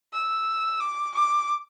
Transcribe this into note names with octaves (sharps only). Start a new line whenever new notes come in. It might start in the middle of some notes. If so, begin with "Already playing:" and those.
E6
D6
D6